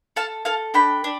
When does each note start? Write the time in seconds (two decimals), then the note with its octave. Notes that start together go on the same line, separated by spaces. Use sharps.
0.16 A4 F5 A5
0.45 A4 F5 A5
0.74 D4 G5 B5
1.04 D4